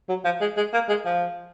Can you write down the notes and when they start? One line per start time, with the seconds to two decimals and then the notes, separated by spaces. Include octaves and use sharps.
0.09 F#3
0.25 F3
0.41 G#3
0.57 G#3
0.73 A#3
0.89 G#3
1.05 F3